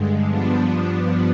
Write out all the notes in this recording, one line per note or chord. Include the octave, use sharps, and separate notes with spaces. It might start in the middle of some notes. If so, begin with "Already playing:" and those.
Already playing: G2 D3 G#3
G2 F3 B3 D4